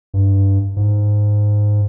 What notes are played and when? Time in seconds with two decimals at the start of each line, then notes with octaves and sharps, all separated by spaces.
0.14 G2
0.76 G#2